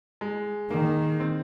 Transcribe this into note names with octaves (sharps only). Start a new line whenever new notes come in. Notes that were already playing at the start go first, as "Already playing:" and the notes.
G#3
D#3 A#3
C4